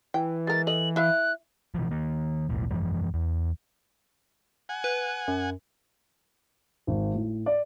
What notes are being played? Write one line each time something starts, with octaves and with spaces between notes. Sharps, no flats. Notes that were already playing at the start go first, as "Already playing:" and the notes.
E3 G5
G#3 A#4 A6
A4 D#5 F#7
E4 E5 F5 F#6
B2 E3 F3
D#3 A#3
E1 B1 A2
F#2 E3 F3 G#3
E2
F#5 G#5
B4
F#2
G#1
A2
D5